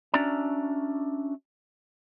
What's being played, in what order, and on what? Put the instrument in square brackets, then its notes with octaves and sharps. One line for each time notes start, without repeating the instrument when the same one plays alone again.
[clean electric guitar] C#4 D4 F#4 D5 E5 A#5